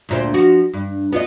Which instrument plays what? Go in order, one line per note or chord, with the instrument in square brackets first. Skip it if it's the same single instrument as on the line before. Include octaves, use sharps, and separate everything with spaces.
[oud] D2 A#2 C5
F3 F#4
G2
B3 F4 D#5